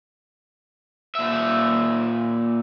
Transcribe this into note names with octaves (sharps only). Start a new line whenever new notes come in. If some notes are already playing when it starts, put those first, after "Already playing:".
A#2 E5